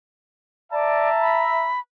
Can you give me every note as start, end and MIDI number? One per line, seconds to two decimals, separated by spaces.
0.72 1.09 74
0.72 1.72 76
0.72 1.46 81
0.72 1.72 82
1.21 1.80 83